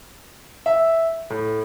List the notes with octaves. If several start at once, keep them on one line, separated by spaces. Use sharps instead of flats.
E5
A2